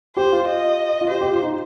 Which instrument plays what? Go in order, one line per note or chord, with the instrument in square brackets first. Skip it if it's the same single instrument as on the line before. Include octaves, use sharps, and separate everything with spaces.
[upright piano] G4 [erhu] C5
[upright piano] F4
[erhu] D#5
[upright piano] F4
[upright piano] G4 [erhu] C5
[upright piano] G4
F4
D#4